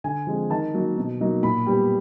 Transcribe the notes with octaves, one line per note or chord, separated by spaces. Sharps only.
D3 G#5
F3 G#3 C4
D#3 A5
F#3 A#3 D#4
B2
F#3 A#3 D#4
A#2 B5
G3 B3